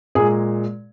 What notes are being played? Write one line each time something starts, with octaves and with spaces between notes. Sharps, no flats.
A#2 G#3 G#4